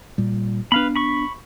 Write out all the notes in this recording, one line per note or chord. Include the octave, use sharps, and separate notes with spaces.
A#2 G3
B3 D4 B4 F5 B5
B5 C#6